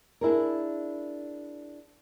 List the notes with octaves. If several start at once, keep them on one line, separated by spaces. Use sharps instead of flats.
D4 E4 G#4 A#4